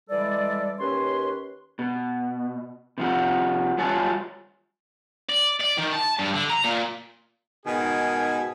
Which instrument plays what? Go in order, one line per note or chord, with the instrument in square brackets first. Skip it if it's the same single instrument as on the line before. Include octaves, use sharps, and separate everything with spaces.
[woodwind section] E3 G3 G#3 A4 D5
D#2 C#4 B4 C#5 C6
[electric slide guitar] B2
C3 F3 F#4
G3 F4 F#4 C#5 G#5 A5
[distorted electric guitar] D5
D5
D#3
A5
G2
D3
A#5
A#2
[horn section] G#2 B2 D#3 G#4 G#5